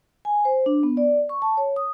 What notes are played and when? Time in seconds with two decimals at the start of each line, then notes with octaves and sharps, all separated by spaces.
0.25 G#5
0.45 C5
0.66 D4
0.83 B3
0.97 D5
1.29 C#6
1.42 A5
1.57 C#5
1.76 D#6